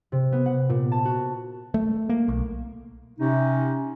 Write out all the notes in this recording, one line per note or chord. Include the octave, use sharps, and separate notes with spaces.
C3
B3
F#5
A#2
A5
F#4
A3
A#3
B1
C3 C#4 D#4